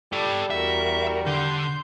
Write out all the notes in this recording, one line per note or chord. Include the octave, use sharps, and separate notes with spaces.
G3 A4 G5 A5 D6
E2 F#4 A#4 E5
D3 C6 G6